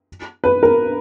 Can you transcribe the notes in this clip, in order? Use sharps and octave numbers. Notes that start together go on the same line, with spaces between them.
B4
A#4